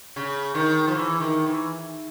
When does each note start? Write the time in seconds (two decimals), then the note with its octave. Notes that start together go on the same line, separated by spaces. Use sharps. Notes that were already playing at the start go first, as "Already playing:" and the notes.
0.16 C#3
0.55 D#3
0.88 F3
0.95 E3
1.20 D#3
1.46 E3